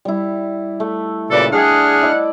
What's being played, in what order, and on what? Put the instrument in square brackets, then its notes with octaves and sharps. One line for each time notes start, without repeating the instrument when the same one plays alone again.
[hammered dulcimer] G3 E4
A3
[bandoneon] A#2 C#3 [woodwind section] F#4 B4 D5 [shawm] A4
[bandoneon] D4 F6 [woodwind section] G#4 [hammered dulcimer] D5 E5 G5 [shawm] F#5
[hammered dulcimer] E4 D5 D#5